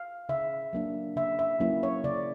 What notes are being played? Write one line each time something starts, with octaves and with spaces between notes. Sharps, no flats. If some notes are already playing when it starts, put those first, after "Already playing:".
Already playing: F5
C#3 E5
F#3 A#3 D4
C#3 E5
E5
F#3 A#3 C#4 E4
C#5
C#3 D5